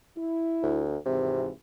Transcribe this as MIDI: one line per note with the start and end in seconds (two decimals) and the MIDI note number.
0.17 0.84 64
0.63 0.97 38
1.06 1.49 32
1.06 1.47 48
1.06 1.49 52